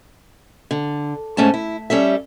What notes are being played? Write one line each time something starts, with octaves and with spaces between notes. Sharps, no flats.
D3
G#2 A3 C#4 G#5 A5
E4
G3 C#4 A4 E5